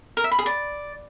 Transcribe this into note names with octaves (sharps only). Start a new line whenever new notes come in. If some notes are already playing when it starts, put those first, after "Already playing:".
A#4
E5
B5
G#4
D5